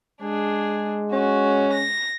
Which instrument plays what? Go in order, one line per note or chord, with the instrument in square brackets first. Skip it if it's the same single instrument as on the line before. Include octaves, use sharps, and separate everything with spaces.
[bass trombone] G#3 [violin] D4 G#4
[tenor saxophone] C#4 [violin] F#4
[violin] A#6